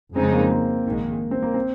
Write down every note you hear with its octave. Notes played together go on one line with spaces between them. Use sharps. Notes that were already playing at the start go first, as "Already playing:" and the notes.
F2 C#3 G#3 C4 D#4
A#3
A#3
A#1 G#2 D#3 G#3
C4
A#3
C4